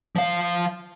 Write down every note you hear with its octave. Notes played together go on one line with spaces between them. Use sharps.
F3 F5